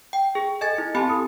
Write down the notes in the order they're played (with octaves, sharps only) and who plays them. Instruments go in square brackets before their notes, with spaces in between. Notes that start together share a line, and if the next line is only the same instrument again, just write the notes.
[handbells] G5
G#4
[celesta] A4 G#6 [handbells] D#5 G#5 A6
[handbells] E4
[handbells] C4 G4 G#5 [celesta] A5 B5
[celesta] A4 D#6